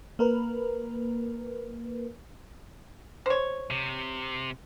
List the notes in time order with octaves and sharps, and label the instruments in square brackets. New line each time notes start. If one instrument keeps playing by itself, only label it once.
[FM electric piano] A#3 A#4 B4
[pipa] C5 C#5
[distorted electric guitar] C3